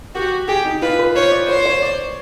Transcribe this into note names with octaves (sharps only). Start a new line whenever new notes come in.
F#4 G4
G4 G#4
D#4
F4 B4
B4
C5 C#5
D5
C5 C#5
C#5
D5